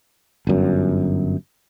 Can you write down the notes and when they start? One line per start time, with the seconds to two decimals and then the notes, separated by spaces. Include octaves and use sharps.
0.47 G1 F#2